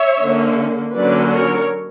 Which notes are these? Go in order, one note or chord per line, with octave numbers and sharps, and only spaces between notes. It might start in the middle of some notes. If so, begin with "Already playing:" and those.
Already playing: C#5 E5
D3 A#3 C#4
D3 F#3 A#3 C#4 B4 D5
A#4 C#5